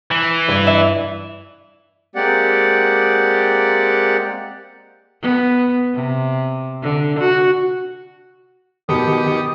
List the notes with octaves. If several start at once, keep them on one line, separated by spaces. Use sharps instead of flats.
E3
G2
E5
G#3 A#3 C4 G4 D5 F#5
B3
C3
D3
F#4
B2 D#3 G4 D#6 C#7